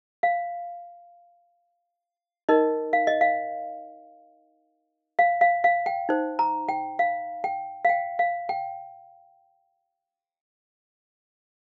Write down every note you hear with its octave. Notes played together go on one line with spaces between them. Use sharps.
F5
D#4 A#4 D#5
F5
D#5
F5
F5
F5
F5
G5
D#4 C5
A#5
G5
F5
G5
F5
G5
F5
G5